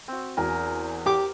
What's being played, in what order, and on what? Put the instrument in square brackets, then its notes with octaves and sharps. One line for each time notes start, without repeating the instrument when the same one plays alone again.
[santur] C4 F#4
[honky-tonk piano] E2 F#4 G#5 [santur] A#4
[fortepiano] G4 D6